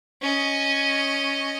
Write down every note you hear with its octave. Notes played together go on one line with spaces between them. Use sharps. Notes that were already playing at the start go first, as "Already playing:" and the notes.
C#4 D#5